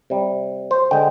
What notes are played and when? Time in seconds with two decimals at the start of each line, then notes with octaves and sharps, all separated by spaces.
0.10 C3 G3
0.71 C5
0.91 D3 G#3 G5